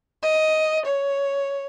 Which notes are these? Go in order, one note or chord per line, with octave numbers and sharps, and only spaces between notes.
D#5
C#5